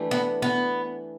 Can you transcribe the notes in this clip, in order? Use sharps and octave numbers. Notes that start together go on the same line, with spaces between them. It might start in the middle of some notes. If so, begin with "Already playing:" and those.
Already playing: E3 A3 D4 G4
B3
B3